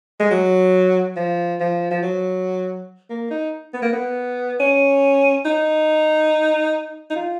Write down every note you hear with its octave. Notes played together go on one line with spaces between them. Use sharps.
G#3
F#3
F3
F3
F3
F#3
A#3
D#4
B3
A#3
B3
C#4
D#4
D#4
F4